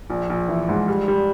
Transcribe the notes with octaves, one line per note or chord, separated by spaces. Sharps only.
A#1
A#1
E3
G#2
G3
G3